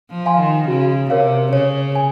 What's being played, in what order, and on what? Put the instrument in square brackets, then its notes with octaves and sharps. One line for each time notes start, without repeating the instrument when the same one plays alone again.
[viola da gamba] F3
[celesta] F5 G#5 C6
[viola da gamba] D#3
[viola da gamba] C#3 [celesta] F#4
[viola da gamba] C3 [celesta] A#4 C#5 F5
[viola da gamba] C#3 [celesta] C#5
[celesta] G#5